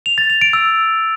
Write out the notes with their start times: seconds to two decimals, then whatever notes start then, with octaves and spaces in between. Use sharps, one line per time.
0.06 F7
0.18 A6
0.30 F7
0.41 D7
0.53 E6